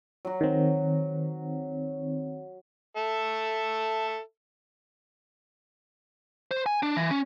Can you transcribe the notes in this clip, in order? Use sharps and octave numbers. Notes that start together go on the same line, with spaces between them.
F#3 F#4
D#3 C4
A4 E5
C5
G#5
D4
E3
C#4